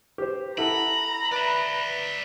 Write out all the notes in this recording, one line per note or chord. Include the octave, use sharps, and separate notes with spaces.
G4 C5
E4 A4 F#5 A#5 B5
B4 D5 E5